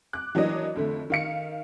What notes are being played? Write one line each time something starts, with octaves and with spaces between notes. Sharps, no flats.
D6 F#6
E3 F#3 A#3 D4 D#5
F2 D3 A3
D#3 F5 C#7